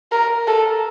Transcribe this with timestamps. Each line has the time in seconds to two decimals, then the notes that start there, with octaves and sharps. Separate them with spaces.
0.12 A#4
0.47 A4